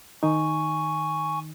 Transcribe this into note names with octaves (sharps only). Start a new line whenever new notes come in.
D#3 D#4 G#5 C#6